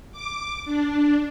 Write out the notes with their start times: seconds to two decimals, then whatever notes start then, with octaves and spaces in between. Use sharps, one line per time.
0.12 D6
0.65 D4